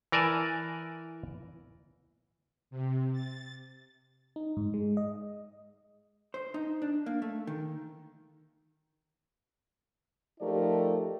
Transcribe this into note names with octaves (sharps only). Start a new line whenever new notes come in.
E3 A#4 D5 G#5 A5
C3
A6
D#4
G#2
G#3
D#5
C5
D#4
D4
A#3
A3
D#3
F3 A3 D#4 G4 A#4 D5